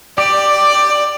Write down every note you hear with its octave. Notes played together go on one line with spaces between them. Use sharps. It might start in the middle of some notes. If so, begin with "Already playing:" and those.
G4 D5